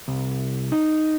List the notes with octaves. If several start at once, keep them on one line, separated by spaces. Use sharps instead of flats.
C2
D#4